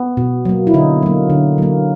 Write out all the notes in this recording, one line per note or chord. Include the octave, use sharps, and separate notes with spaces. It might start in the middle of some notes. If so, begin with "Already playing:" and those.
Already playing: B3
B2
F#3 A#3
E4
D3 D#4
F#3 A#3
D3
F#3 A#3